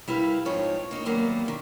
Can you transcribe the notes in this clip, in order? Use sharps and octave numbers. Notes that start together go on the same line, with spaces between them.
G3 E4 A#4 B4 F5
G#2 F3 C4 D#4 C#5
A#3 D#4 A#4 C#5
D#2 F#3 G3 A#3 B3
F#2 D#3